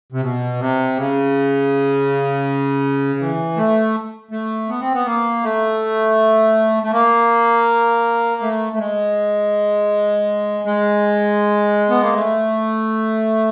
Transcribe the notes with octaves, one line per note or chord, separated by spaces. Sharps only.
C3
B2
C3
C#3
E3
A3
A3
B3
C4
B3
A#3
A3
A3
A#3
A3
A3
G#3
G#3
B3
A#3
A3